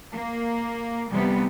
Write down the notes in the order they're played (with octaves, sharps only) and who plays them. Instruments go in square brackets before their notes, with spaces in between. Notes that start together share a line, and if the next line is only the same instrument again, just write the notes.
[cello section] A#3
C3 E3 G3 B3